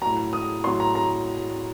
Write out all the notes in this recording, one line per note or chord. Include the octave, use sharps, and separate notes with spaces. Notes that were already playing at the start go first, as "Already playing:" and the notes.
A2 F#3 A#5
D#6
A2 F#3 C6
A#5
A#5